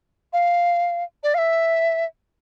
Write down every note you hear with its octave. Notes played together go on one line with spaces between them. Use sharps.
F5
D5
F5
E5